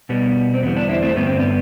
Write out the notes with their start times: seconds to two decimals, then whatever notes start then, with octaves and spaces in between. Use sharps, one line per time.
0.09 B2 G3 B3
0.54 C4
0.62 E2 D3 G3 B3
0.76 B3 D4
0.89 C4 E4
1.02 A3 C4
1.16 G2 D3 G3 B3
1.27 C4
1.39 B3